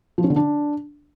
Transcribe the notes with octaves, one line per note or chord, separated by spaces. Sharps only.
F3
C#4
D3
D4